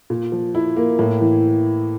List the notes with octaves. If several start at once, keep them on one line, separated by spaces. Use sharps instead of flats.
A#2
F3
E4
A#3
A2
E3